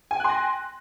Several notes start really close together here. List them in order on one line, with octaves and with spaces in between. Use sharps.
G#5 G5 F#6 C6 A#6